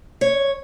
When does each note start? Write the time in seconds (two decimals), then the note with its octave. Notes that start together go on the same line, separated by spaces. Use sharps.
0.21 C#5